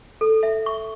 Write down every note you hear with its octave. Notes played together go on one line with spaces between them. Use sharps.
A4
E5
C#6